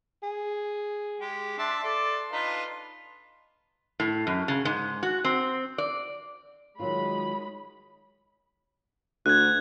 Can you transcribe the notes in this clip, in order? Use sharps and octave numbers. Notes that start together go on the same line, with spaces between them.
G#4
G#3 G4
D4 E5 A5 C6
A4 D5 C6
D4 D#4 F4 B4
A2
F#2
C#3
G#2
F#4
C4
D5
D#3 F#3 G#3 F4 B5
D2 F#6 G#6